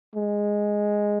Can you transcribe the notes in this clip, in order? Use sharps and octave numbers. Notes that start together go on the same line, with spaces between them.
G#3